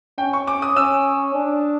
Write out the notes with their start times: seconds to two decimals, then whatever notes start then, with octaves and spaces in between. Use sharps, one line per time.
0.18 C#4 G5
0.33 C#6
0.47 D6
0.62 D#6
0.76 C#4 E6
1.34 D4